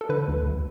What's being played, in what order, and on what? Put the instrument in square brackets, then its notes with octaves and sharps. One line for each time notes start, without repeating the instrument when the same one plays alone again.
[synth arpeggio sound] A4
D3 B4
D2
D2